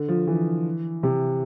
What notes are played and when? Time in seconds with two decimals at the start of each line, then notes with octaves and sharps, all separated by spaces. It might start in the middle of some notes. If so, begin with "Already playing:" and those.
Already playing: D3
0.09 F3
0.27 E3
1.03 C3